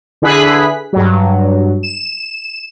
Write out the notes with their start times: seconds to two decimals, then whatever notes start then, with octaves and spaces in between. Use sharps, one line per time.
0.22 D3 E4 G#4 B4 F#6 B6
0.93 G2 F#3
1.83 E7